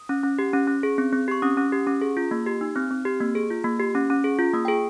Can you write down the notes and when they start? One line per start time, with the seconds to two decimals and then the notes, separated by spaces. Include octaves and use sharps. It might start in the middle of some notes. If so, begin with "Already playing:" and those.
Already playing: D#6
0.09 C#4
0.23 C#4
0.39 G4
0.53 C#4
0.68 C#4
0.83 G#4
0.98 C4
1.13 C4
1.28 G4 C#6
1.42 C#4 D#6
1.57 C#4
1.72 G4
1.87 C#4
2.02 G#4
2.17 F4
2.31 A#3
2.46 G4
2.61 D#4
2.76 C4 F6
2.91 C4
3.05 G4
3.21 A#3
3.35 G#4
3.51 F4
3.64 A#3
3.79 G4
3.95 C#4
4.10 C#4
4.24 G#4
4.39 F4
4.53 A#3 D#6
4.65 G5
4.68 G#4